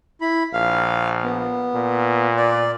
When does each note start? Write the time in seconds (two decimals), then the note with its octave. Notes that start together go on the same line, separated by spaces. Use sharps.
0.21 E4 B5
0.53 A#1 F5
1.24 B3
1.75 A#2
2.37 D5